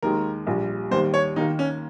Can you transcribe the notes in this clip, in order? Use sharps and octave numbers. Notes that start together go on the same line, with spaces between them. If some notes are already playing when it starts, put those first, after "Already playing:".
D#2 D#3 G#3 A#4
A#1 A#2 G3
D#2 D#3 G3 C5
C#5
D#2 D#3 A#3 D#4
C#4